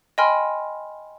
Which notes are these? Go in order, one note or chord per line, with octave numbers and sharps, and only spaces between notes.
D#5 G5 G#5 B5 C6 F6